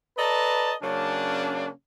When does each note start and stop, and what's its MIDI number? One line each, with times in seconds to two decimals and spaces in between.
0.18 0.73 69
0.18 0.73 71
0.18 0.73 74
0.18 0.73 75
0.18 0.73 81
0.18 0.73 82
0.82 1.69 49
0.82 1.69 54
0.82 1.69 58
0.82 1.69 61
0.82 1.69 62